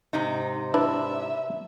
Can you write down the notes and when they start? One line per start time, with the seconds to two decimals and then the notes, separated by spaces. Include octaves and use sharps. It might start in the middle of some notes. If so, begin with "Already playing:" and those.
0.13 G#2 C3 D#4
0.74 D4 E4 B4 D5 E5 D6